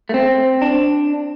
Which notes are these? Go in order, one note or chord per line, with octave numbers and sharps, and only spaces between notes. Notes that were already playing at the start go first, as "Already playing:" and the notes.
A3
C4
D4